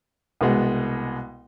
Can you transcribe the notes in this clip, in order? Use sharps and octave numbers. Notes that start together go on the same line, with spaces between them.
C2 B2 G#3 B3